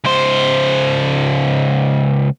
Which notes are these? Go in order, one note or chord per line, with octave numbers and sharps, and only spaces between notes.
C#2 C5